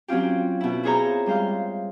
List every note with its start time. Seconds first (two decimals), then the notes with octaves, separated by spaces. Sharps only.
0.08 F#3 C4 C#4 F4 G4
0.61 B2 E4
0.83 E4 F4 G#4 C5 C#5 A#5
1.26 G3 G#3 C5 F5 C6